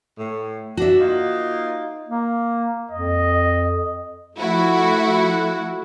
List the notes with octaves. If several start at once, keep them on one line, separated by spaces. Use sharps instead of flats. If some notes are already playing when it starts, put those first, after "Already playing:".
A2
D4 F#4 E5
A#3 D#4 F4
A#3
F2 D#5
F3 A3 E4 F#4